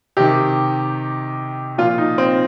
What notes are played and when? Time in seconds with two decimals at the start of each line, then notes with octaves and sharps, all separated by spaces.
0.17 C3 D#3 G4
1.78 A#2 F3 F4
1.98 D#4
2.18 C4